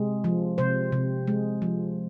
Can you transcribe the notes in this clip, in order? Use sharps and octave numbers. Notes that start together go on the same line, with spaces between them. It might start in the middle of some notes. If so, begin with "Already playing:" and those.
Already playing: C3 G#3
F3
C3 C5
C3
G#3
F3